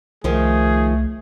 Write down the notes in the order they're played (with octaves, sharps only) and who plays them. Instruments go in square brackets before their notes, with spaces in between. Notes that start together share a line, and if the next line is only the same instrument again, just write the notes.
[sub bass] C2 [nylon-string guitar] D#3 F3 [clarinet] A3 [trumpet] G#4